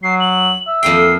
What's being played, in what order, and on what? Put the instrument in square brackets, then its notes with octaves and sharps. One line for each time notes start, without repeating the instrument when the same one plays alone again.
[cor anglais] F#3 [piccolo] C7
[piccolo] F#7
[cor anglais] E5
[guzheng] F2 A#3 G5 [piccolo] C7